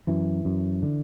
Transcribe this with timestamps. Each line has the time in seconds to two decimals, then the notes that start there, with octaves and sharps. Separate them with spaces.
0.07 F#2 E3
0.45 F#2
0.82 D3